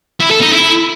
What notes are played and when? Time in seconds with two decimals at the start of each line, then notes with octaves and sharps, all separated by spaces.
0.20 E4
0.31 A4
0.42 D#4
0.52 E4